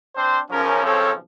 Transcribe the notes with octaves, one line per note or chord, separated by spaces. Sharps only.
C4 D4 C5
B1 C#3 F3 C#4 A#4
C4 A4 C#5